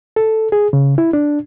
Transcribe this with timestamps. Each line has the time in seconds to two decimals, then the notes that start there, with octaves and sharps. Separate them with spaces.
0.16 A4
0.52 G#4
0.73 C#3
0.98 E4
1.13 D4